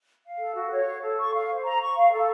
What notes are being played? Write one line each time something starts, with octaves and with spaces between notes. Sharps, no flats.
F5
A4
F#4
C#5
F5
A4
C#6
F5
C5
A#5
C#6
F5
A4